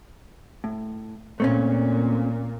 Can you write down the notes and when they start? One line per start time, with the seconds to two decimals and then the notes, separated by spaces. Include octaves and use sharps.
0.64 A2
1.40 A#2 A3 C4 C#4